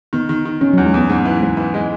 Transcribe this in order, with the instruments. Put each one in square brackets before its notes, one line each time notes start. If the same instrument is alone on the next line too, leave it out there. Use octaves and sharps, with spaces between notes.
[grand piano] D#3 [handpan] B3
[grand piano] D#3
D#3
[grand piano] D#3 [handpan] C#4
[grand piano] E2 [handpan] F#3
[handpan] G#3
[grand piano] E2 [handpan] B3
[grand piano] G#2
E3
G#2
E3
G#3